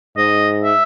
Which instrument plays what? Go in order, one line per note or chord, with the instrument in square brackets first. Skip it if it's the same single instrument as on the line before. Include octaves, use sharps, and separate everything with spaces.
[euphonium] G#2 [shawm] D#5
[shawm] E5